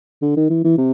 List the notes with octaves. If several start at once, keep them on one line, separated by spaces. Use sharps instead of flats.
D3
D#3
E3
E3
C3